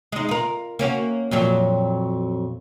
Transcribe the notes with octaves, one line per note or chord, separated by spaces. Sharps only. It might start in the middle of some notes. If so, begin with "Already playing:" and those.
G#3 D#4
F4 A#4
A#3 C#4 F#4
F2 A#2 F#3